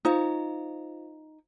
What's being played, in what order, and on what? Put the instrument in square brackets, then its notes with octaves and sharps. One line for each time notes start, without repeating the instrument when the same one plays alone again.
[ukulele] D#4 [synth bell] F4 C5 F5